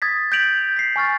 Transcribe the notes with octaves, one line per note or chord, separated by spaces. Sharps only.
D#6 G#6 A6 B6
G6 G#6 B6 D7 F7 F#7
B6 C7
G#5 C#6 F6 A6